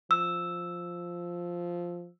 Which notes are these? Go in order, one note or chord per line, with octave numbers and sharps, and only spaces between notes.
F3 E6